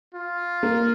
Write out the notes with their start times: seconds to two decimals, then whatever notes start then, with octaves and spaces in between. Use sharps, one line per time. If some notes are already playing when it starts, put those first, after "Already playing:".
0.14 F4
0.63 A#3 A#4